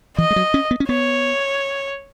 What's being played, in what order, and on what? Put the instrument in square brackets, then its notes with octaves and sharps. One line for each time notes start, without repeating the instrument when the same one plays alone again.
[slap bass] E3 [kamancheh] D#5
[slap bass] G#3
F#3
C#4
B3
C#4
[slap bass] B3 [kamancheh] C#5